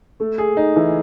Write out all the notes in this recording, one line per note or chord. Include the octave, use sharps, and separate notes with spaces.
A3
G#4
D#4
E3